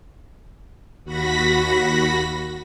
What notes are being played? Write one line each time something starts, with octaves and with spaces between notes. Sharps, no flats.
D#2 F#4 B5 A#6 B6